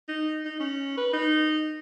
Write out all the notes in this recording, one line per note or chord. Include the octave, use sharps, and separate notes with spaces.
D#4
D#4
C#4
B4
D#4